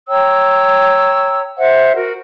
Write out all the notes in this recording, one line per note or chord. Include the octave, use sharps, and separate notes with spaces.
C#5 G5 A#5 E6
C5 E5 F#5
F#4 A#4